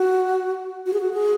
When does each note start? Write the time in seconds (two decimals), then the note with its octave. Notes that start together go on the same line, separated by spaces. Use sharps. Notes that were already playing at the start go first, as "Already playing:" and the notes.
Already playing: F#4
0.86 F#4
0.93 G#4
1.00 F#4
1.13 G#4